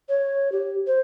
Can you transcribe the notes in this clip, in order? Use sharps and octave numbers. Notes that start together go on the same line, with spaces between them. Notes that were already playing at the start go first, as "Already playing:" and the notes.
C#5
G4
C5